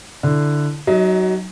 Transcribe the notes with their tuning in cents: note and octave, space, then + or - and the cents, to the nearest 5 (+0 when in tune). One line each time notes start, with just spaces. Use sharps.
D3 +0 E4 +0
F#3 +15 D#4 +0 D#5 +35